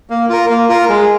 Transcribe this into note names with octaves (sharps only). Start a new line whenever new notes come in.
A#3
F4 A#4
A#3
F4 A#4
G#3